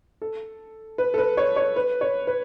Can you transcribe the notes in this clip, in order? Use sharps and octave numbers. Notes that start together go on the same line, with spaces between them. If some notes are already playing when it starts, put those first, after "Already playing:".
A4
B4
A4
B4
C#5
C#5
B4
C#5
B4